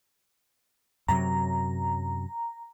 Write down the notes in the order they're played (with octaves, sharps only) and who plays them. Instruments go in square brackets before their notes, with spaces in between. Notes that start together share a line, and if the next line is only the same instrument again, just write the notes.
[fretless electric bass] F#2 C3 F#3 [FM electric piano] A#5